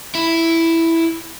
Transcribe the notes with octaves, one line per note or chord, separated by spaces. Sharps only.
E4